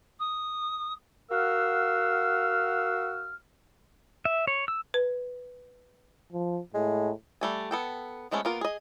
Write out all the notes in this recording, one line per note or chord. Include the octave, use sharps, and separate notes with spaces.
D#6
F#4 A#4 F5 F#5 E6 F6
E5
C#5
E6
B4
F3
A2 G#3
G3 A3 G#5
B3 A4 G5
F3 G#3 A3 B3 C#4
A#3 B3 F4 A#4
G#4 D#5